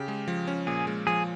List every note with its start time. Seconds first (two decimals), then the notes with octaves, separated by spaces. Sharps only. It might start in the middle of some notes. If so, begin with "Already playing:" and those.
Already playing: C#3 G4
0.08 G#3
0.28 F3
0.47 C#4
0.67 A#2 G#4
0.87 G#3
1.07 F3 G#4